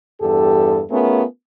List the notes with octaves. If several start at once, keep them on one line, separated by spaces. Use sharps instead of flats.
E2 G2 G4 A4
A3 B3 C#4 F4 G#4 A#4